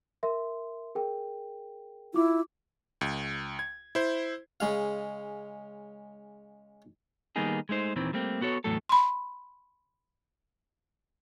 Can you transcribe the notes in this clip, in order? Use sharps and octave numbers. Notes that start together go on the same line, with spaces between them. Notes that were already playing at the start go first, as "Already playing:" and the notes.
A#4 E5 C6
G#4 A#4 G5
E4 F4 D6
C#2
G#6
E4 C5
C#3 G#3 F5
D#3 G3 A#3 B3 D#4 G#4
G#3 A3 D#4 C5
D#2 A#2 D#3 E3 C4
G3 A3 A#3 C4
B3 F#4 A4 C#5
E2 A2 F#3 A3 A4
B5 C6